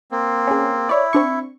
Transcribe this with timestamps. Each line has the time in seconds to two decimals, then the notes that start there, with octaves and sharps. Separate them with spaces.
0.11 A#3 C4
0.47 C#4 G#4
0.89 E4 C#5 D5
1.13 C4 D4 C#6